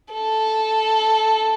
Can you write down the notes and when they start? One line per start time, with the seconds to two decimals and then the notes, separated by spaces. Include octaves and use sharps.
0.13 A4